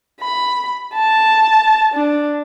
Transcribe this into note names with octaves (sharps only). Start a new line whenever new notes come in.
B5
A5
D4